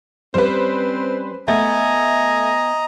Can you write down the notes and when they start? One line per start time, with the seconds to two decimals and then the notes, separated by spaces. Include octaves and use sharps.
0.34 G3 C4 C#4 B4 C5
1.48 A3 B3 D#5 G#5 A#5